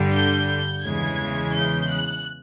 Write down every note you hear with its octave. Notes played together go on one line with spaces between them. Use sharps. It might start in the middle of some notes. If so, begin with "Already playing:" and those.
Already playing: G2 D3 G3
G6
E2 C#3 E3 G#3 G#6
G6
F#6